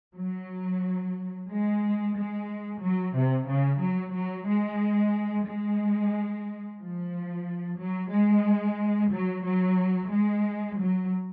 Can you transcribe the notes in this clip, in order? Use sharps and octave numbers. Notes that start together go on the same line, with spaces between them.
F#3
G#3
G#3
F#3
C3
C#3
F#3
F#3
G#3
G#3
F3
F#3
G#3
F#3
F#3
G#3
F#3